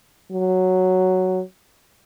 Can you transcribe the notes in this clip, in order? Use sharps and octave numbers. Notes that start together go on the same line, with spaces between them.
F#3